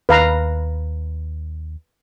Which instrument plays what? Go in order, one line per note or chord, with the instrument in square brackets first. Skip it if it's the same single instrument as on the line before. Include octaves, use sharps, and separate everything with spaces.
[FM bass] D#2 [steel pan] B4 F5 A#5